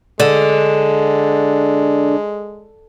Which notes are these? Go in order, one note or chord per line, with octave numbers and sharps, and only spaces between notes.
D3 G#3